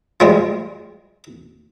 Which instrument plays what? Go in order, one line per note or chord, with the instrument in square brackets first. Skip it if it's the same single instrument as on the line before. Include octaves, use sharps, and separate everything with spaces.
[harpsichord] F3 G3 G#3